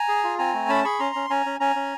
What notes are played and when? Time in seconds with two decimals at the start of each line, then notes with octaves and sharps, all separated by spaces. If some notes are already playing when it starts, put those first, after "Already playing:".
Already playing: G#5 A#5
0.08 G#4
0.24 F4
0.39 C4 G#5 A#5
0.54 A3
0.69 C#4 A5 B5
0.84 G#4 B5 C#6
1.00 C#4 A#5 C6
1.15 C#4
1.30 C#4 G#5 A#5
1.46 C#4
1.60 C#4 G#5 A#5
1.76 C#4